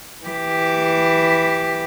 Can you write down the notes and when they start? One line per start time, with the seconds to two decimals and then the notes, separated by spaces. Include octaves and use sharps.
0.24 E3 G4